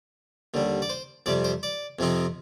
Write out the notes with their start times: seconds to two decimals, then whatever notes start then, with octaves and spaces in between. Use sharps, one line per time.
0.54 D#2 D3 G3
0.82 D5
0.90 C5
1.26 F2 C3 G3 D5
1.44 C5
1.63 D5
1.99 F2 C3 F3 C4 D#4